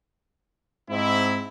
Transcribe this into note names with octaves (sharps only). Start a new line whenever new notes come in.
G#2 C4 E4